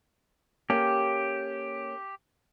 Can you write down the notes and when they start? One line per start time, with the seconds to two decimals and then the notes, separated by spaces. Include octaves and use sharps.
0.70 A#3 C#4 G4 A4